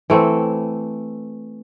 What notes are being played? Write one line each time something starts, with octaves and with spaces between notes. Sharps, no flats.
E3 A3 C4